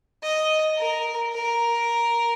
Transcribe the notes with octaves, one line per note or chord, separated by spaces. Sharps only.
D#5
A#4
A#4